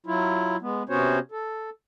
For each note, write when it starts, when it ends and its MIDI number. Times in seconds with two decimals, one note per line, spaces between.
0.06 0.57 54
0.06 0.57 64
0.06 0.57 65
0.62 0.83 56
0.62 0.83 59
0.89 1.19 48
0.89 1.19 59
0.89 1.19 61
0.89 1.19 66
0.89 1.19 72
0.89 1.19 73
1.32 1.70 69